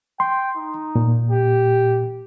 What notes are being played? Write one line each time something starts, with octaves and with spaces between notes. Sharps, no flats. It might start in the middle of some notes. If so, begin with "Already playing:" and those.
G5 C6
D#4
A#2
G4